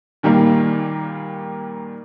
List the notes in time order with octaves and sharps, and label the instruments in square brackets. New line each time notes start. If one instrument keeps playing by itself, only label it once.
[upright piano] A#2 D#3 G3 A#3